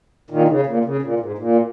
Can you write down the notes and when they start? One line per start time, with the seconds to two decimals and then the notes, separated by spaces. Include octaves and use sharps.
0.30 A#2 D#3
0.48 C#3
0.66 A#2
0.85 C#3
1.02 A#2
1.20 G#2
1.38 A#2